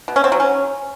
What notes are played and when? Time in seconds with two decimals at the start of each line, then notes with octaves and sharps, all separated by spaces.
0.08 B2
0.16 C#4
0.24 C4
0.32 F#3
0.40 C#4